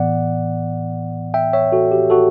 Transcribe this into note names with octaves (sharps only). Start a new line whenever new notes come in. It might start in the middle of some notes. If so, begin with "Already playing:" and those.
Already playing: A2 E3 B3 D5 F#5
E5 G5
C#5 E5
F#4 A4
G4
F#4 A4